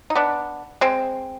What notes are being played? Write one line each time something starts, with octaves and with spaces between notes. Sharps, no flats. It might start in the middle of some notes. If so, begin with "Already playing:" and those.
D#4
B3 D4
G#3 C4